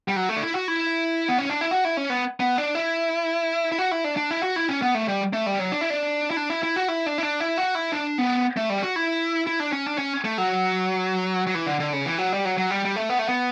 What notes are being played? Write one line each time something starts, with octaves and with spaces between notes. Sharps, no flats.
G3
F#3
A3
D4
E4
F#4
E4
B3
C#4
D4
E4
F#4
E4
C#4
B3
B3
D4
E4
E4
F#4
E4
D4
D4
E4
F#4
E4
C#4
B3
A3
G3
A3
G3
F#3
D4
E4
D4
E4
D4
E4
E4
F#4
E4
D4
E4
D4
E4
F#4
E4
D4
B3
A3
G3
F#4
E4
E4
D4
C#4
D4
C#4
A3
F#3
F#3
E3
D3
D3
C#3
E3
F#3
G3
F#3
F#3
G3
G3
A3
B3
A3
B3